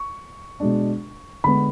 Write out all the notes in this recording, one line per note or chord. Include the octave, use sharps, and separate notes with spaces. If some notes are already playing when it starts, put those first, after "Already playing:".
Already playing: C#6
B2 G#3 D4
D3 G#3 B3 B5